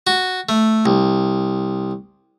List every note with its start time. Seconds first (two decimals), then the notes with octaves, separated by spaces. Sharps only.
0.07 F#4
0.49 A3
0.86 C2